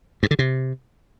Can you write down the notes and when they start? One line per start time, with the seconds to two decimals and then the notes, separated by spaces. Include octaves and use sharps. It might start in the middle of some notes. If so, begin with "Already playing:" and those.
0.23 G2
0.31 D3
0.39 C3